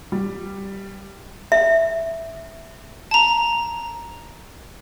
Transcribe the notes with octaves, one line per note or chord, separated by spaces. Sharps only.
G3
E5
A5 A#5